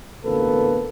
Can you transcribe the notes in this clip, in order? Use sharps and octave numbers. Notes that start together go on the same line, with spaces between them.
A1 B2 D3 A#3 A4 B4